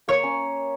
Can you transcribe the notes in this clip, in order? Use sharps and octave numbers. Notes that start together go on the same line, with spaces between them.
A#3 C#5
C#4